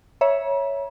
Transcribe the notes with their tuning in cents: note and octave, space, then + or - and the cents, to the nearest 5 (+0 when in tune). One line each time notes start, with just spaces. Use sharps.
C#5 +0 E5 +0 A#5 +45